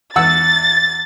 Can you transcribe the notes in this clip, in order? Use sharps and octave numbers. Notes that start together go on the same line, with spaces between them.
E2 F#5 E6 A6